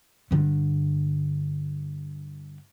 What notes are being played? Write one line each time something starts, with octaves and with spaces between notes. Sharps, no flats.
G2 D3